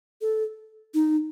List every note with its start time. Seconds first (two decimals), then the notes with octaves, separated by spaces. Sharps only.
0.21 A4
0.94 D#4